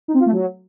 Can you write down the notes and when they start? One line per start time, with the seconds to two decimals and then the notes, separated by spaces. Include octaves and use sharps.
0.08 D#4
0.14 C4
0.20 F4
0.26 A3
0.32 F#3